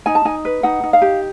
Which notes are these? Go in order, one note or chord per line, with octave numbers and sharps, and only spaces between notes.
D#4 G#5
A5
D#4 G#5
B4
D#4 F#5
D#4
F5
G4